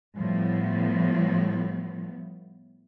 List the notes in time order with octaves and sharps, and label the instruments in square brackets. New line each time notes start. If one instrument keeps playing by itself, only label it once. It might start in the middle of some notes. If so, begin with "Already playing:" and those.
[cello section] A2 F3 G3 B3